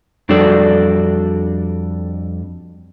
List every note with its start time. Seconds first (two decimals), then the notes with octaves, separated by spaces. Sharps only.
0.29 F2 G3 D4 F#4 A4 D5